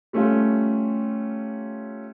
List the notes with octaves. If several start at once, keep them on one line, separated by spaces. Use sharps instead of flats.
G3 A3 C#4 F4